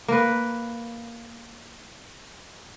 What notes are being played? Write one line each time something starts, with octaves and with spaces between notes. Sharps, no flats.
A#3 B4